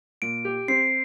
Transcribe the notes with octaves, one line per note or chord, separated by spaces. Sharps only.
A#2 D7
G4
C4 C7